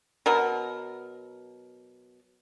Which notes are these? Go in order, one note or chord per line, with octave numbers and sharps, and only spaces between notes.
B2 F#3 A#4